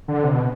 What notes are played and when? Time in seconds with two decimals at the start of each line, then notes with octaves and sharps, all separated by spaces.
0.08 D3
0.23 C3
0.33 B2